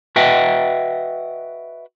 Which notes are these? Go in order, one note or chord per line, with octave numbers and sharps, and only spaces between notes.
F#4 B4 D#5 E5 F#5 G5